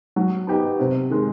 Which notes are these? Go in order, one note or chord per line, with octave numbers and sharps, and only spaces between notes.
F#3
B3 D#4 G4
C3
D#3 G#3